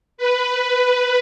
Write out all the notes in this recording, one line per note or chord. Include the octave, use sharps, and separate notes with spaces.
B4